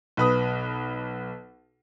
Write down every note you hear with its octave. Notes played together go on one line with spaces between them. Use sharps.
B1 B4 D#6